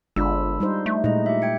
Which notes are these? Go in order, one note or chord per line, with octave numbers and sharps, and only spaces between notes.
G1 G#3 D4 F4 B5 E6
G3 D#4 C5
A3
A#2 G#3 D#4 E4 D#5
G4 E5
G5 G#6 C#7